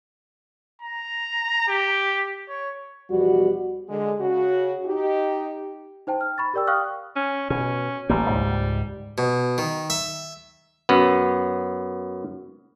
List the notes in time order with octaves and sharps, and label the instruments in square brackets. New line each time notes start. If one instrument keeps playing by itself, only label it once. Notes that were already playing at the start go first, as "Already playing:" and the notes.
[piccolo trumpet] A#5
G4
C#5
[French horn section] E2 B2 F3 G3 F#4
D3 G#3
C#3 F#4
D#4 G4
[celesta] D#4 C5 G5 A5
F6
B5 C#6 A6
G4 A#4 D5 G5 E6
F5 G5 C#6 D#6 F6 F#6
[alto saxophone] C#4
[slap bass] B2 [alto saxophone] C#4
[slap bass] A1 A#3 [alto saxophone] G3
[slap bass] C#2 G#2
[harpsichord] B2
D#3
E5
[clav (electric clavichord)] F#2 B3